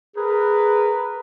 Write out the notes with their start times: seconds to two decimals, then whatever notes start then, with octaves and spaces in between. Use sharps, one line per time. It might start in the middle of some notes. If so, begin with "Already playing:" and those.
0.16 G#4 A#4 B4